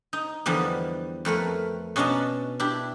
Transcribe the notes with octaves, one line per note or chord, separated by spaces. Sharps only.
D#4
E2 D3 F3 G3 B3
F2 A3 A#4 B4
B2 C#4 D4 D#5 A5 A#5
D4 E4 G4